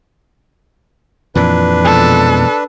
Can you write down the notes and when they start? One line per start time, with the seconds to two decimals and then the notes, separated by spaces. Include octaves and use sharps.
1.35 F2 A#2 E3 D4 B4
1.85 B2 F3 G#3 A4